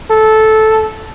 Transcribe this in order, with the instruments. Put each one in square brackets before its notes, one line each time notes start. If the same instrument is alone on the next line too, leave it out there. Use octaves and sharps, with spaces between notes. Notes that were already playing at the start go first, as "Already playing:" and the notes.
[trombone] A4